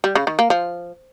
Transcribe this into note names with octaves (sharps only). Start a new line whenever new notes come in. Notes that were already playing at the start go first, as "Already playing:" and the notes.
G3
C#3
D#3
A#3
F3